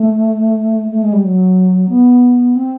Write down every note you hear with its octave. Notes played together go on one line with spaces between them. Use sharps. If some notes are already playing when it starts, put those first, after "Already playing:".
Already playing: A3
A3
G#3
G3
F#3
B3
C4